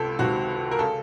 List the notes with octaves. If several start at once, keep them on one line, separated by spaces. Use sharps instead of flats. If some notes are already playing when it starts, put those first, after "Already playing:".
Already playing: C#2 C3 A4
C#2 C3 D#3 F#4
A#4
C#3 A4